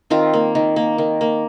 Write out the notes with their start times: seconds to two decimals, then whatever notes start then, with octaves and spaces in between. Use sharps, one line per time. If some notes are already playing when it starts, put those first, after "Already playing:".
0.10 D#3 C4 F4
0.33 A#3
0.55 D#3
0.76 A#3
0.98 D#3
1.21 A#3